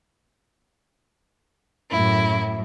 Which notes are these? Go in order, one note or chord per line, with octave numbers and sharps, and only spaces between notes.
F#2 A2 E4